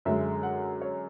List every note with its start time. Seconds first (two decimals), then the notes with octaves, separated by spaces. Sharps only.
0.05 F#2 D3 G#3 E5
0.43 F#5
0.82 C#5